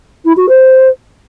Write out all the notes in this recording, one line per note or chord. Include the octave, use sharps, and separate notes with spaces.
E4
F#4
C5